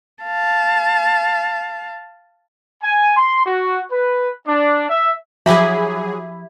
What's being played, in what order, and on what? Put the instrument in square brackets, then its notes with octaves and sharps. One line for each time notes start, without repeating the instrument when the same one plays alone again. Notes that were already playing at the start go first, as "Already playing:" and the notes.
[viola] F5 A5
[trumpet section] G#5
C6
F#4
B4
D4
E5
[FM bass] F3 [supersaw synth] F#3 G#4 [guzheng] E4 G4 B5 [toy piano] E5